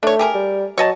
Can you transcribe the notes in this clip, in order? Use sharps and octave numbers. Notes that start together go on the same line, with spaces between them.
A3 D4 C#5
G4 G#4 A#4
G3
F#3 C#5 D#5 A5